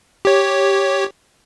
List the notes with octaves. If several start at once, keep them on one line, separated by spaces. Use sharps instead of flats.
G4 C#5